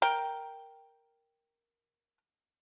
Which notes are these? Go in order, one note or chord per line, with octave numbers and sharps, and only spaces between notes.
A#4 G5